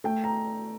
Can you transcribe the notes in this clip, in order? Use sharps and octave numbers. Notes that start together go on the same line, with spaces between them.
A3 G5
A#5